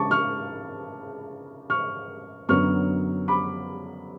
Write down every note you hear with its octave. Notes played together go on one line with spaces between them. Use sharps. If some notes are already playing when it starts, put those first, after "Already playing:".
Already playing: C#3 G#3 A5 C#6 D6
C#6 F6
C#6 F6
F#2 D3 F#3 B3 C#6 F6
B5 D6